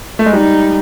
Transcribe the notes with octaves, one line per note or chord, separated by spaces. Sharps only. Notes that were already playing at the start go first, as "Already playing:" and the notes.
A3
G#3
G3 D#4